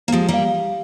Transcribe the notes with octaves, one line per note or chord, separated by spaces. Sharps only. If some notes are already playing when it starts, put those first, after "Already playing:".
A#3
F3 G#3 G4
G3 A#3
F5